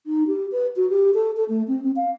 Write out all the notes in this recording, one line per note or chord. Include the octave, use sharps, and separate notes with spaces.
D#4
G4
B4
F#4
G4
A4
A4
A3
C4
C4
F5